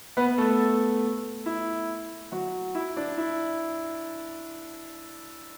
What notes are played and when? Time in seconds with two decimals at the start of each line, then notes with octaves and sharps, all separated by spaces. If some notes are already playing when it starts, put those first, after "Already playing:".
0.17 B3 B4
0.38 A3 A4
1.46 E4
2.32 F#3 F#4
2.75 E4
2.97 D4
3.18 E4